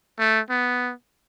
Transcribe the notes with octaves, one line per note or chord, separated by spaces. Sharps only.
A3
B3